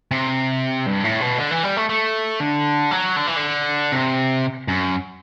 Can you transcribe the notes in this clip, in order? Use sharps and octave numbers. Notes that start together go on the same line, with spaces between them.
C3
G2
A2
B2
D3
E3
G3
A3
A3
D3
F#3
D3
E3
D3
C3
F#2